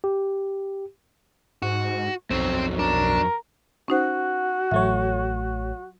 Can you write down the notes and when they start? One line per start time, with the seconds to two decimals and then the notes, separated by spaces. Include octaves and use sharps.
0.04 G4
1.62 G#2 F#4
2.30 B1 F2 F#3 C4
2.79 D4 A#4
3.88 C#4 D#4 F#4 C5
4.71 A1 F#3 A3 C#5 E5